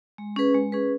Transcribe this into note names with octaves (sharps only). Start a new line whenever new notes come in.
G#3
C#4 G#4 B4
G#3
C#4 G#4 B4